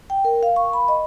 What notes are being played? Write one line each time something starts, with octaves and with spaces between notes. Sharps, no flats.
G5
A#4
F5
C#6
B5
D#5